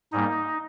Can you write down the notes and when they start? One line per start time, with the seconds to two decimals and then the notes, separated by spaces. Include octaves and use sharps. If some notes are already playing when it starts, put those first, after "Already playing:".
0.12 G#2 G3 A#3 D#4